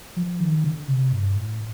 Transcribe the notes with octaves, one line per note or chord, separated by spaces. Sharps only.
F3
D#3
D3
C3
G2
A2